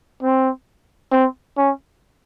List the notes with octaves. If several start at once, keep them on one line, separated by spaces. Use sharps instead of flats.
C4
C4
C#4